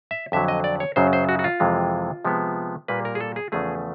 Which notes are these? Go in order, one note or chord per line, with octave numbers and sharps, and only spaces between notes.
E5
F2 D3 F#3 E5
D#5
D5
C#5
F#2 C#3 F#3 C5
C5
F#4
F#4
F4
F2 C3 E3 G#3
C3 F3 G#3 B3
A#2 G3 A#3 B4
A#4
G#4
A4
G#4
E2 C#3 F3 A3 G#4